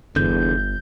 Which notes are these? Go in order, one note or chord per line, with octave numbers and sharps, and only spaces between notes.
G1 E2 D3 G6